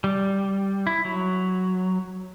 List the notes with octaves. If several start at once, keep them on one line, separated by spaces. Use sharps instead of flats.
G3
E4
F#3